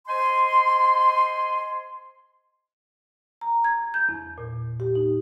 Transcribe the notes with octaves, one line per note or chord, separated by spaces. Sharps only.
C5 D#5 G#5 C6
A#5
G#6
G6
E2
A#2
G4
D#4